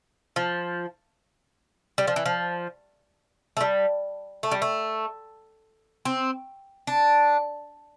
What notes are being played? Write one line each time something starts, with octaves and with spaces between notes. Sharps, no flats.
F3
G3
F3
E3
F3
A3
G3
A3
G3
A3
C4
D4